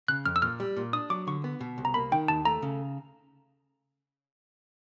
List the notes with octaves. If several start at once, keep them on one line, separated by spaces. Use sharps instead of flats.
C#3 F#6
F2 F6
E6
A#2 F6
G3
A#2
D4 D#6
F#3 D6
D3 C#6
B3
B2
C2
A#5
A#3 B5
D#3 G5
D#2 A5
A3 A#5
C#3